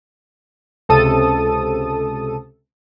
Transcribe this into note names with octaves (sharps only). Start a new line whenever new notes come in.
C#2 C3 A4 A5 D#6 D#7